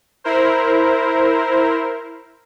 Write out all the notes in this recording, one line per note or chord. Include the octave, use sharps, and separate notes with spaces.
E4 A#4 C5